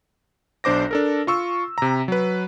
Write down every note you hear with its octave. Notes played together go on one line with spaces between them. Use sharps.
B1 D4 C5 D6 A#6
D4 A4 A#4
F4 C#6 E6
C3 A#5
F#3 B4